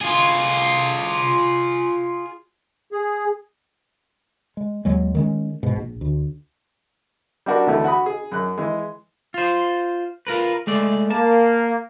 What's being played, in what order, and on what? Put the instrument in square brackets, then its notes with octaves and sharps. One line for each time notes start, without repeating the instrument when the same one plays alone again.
[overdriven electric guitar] F4 G#4
[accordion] G#4
[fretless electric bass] G#3
D#2 F#3 G#3
D#3 G#3 C#4
G#2 B2
A#1
D2
[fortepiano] G3 D4 F#4 A#4
D2 E3 A3
F#4 F#5 B5 D#6
G#4
F#2 F#6
E3 G#3
[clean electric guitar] F4 C5
F4 A#4 B4
G#3 A3 D5
[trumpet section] A#3 [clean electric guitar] A5